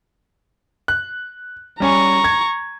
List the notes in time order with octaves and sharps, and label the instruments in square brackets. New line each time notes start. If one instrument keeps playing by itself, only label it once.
[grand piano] F#6
[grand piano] G3 C#4 G#5 [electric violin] A#5 C#6
[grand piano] G#6